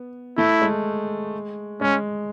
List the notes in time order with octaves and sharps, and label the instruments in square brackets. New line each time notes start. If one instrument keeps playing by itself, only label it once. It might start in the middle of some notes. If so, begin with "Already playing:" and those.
Already playing: [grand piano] B3
[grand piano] A3 [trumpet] E4
[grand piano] G#3
[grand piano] G#3 [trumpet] C#4